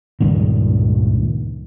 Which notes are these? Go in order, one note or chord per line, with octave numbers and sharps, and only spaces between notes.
C#2 G2 A#2 D#3